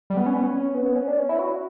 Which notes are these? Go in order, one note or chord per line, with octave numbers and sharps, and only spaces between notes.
G3
B3
C#4
B3
C#4
B3
B3
C#4
D4
C#4
E4
F#4